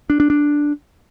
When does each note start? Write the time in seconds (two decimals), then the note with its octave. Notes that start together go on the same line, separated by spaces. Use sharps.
0.10 D4
0.20 D4
0.30 D4